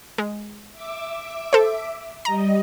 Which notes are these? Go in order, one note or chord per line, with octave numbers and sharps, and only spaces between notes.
G#3
E5 D6
A4 C5
G3 D#5 A#5